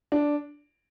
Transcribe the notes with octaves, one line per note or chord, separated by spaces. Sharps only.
D4